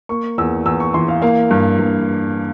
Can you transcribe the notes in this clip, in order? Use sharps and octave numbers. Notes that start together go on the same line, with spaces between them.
A#3 C#6
E2 E6
E2 E6
C#6
E3 C6
F5
A#3 F5
G2
G2